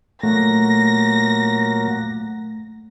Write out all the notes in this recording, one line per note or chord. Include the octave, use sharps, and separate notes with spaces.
A#2 F#3 A3 A#3 A#6